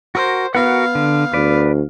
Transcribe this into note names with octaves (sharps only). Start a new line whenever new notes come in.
F#4 A#4 C5
B3 F#4 A#4 F5 F#5
D3
D2 B4 D5